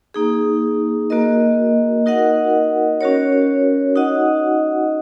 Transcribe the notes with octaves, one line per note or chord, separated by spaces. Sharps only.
A#3 D#4 G#4
A#3 F#4 A#4 D#5
D#4 F#4 A#4 D#5 F#5
C#4 F#4 A#4 C#5
D#4 F#4 D#5 F#5